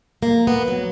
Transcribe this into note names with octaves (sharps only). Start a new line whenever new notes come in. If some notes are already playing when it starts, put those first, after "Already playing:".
A#3
B3
F#3